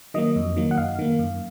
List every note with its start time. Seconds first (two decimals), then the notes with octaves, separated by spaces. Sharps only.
0.14 D#3 F#3 A#3 D#5
0.36 F2
0.57 D#3 F#3 A#3
0.71 F#5
0.78 F#2 F5
0.99 D#3 A#3
1.19 F#2